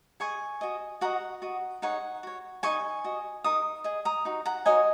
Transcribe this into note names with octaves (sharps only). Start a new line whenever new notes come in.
G#4 D#5 G#5 C#6
F#4 D#5
F#4 D#5 F#5 A#5
F#4 D#5
D#4 G#4 C#5 F#5
F#4 C#5
D#4 F#4 D#5 G#5 C#6
F#4 D#5
D#4 A#4 D#6
G#4 D#5
A#5 D#6
D#4 F#4
F#5 A#5
D#4 F#4 C#5 D#5 G#5